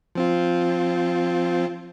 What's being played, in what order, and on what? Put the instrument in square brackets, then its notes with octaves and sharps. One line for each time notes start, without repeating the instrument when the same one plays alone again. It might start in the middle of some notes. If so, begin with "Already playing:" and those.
[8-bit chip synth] F3 C4 F4